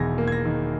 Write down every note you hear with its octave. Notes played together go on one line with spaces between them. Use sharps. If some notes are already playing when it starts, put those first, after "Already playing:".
Already playing: E1 E2 D#3 G#6 A#6
A#3
G#6
A#6
D#3